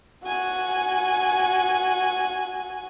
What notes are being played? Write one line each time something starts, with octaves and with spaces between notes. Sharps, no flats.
F#4 G#5